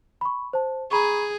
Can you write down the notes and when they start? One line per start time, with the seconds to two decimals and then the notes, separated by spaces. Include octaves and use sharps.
0.21 B5 C#6
0.53 C5 A5
0.91 G#4 A#5 B5 C#6